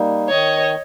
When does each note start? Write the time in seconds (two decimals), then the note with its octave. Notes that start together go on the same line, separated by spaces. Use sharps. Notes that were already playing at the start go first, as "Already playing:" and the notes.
Already playing: G3 A#3 D#4
0.29 D#3 C#5 D#5